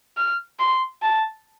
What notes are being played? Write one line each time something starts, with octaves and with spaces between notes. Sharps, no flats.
F6
C6
A5